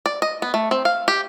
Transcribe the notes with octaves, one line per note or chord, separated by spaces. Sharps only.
D5
D#5
B3
A3
C4
F5
G4